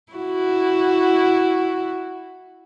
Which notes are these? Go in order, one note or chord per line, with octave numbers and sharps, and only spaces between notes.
E4 F#4